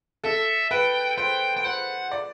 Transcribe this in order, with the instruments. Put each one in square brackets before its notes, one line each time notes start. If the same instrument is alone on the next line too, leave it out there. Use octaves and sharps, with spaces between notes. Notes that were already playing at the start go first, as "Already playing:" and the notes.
[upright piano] A4 [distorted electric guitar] E5
[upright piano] B4 [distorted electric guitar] G5
[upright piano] C5 [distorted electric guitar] G5
[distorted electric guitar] G5
[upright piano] C5 [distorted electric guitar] F#5
[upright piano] D5